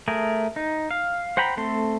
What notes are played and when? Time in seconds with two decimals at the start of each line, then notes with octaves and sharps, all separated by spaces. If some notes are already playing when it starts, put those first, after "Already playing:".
0.08 A3 G#4 A#4
0.56 D#4
0.91 F5
1.37 C5 F#5 G5 A#5 B5
1.57 A3 C4 A4 C6